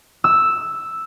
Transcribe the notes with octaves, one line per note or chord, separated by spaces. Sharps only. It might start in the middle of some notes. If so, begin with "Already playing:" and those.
E6